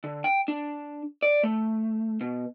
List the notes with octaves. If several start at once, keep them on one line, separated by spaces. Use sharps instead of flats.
D3
G5
D4
D5
A3
B2